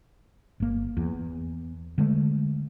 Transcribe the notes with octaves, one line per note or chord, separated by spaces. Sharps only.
G1 A#3
E2
D3 G#3 A3